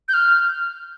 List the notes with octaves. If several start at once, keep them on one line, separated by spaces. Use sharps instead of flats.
G6
F6